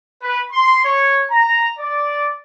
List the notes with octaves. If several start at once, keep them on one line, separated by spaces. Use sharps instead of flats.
B4
C6
C#5
A#5
D5